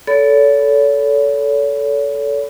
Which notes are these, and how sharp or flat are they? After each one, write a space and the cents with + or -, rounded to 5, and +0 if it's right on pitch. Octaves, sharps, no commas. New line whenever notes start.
A4 -5 C#5 +40 B5 +15